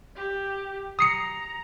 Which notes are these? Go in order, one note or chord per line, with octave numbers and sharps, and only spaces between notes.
G4
A#5 D#6 C7 C#7